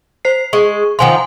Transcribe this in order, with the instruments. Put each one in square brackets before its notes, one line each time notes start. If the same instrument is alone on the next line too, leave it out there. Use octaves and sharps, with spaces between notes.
[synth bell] C5 C7
[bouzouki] G#3 [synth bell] C#6
[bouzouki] D#3 F3 F4 [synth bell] F#5 G#5 C6